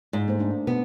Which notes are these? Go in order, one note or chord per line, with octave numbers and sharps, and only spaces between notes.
G#2
A3 A#3 C5
A3 A#3 D4
B2 B3